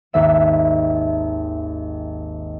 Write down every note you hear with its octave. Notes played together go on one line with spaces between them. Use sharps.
G#1 D#2 E5 E7